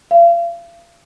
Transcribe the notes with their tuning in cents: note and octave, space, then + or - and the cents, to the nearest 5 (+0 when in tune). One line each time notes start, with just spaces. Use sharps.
F5 -35